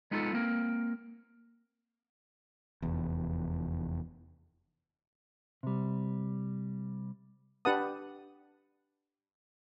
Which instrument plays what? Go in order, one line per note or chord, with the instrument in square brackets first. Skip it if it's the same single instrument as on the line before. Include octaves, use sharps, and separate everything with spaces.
[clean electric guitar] G#3 B3 D#4 F4 G4 A4
A#3 C4 A#4
[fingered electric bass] F1 E2
[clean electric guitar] C3 G3
[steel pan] D4 G4 B4 F#5 A5 D#6